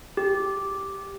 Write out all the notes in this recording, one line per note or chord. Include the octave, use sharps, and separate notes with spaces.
G4